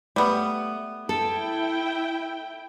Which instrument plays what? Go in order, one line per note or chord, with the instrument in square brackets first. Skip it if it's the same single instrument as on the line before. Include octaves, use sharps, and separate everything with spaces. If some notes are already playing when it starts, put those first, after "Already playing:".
[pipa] G3 B3 [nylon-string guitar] A3
[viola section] E4 G5 [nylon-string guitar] A4